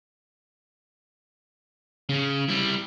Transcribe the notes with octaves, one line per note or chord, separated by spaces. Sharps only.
C#3
G3 E4